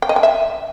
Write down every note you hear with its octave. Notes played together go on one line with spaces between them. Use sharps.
G5
D#5
G5
E5